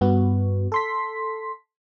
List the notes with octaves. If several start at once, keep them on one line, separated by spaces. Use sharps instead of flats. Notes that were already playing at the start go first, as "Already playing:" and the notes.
G2 B3 F#4
A4 C6 B6